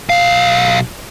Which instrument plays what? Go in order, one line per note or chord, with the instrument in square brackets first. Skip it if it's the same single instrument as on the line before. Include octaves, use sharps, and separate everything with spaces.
[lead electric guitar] B1 F5